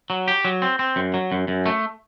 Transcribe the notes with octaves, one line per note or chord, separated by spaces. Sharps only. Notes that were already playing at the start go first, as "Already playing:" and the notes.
F#3
G4
F#3
C4
C4
F#2
F#3
F#2
F#2
A3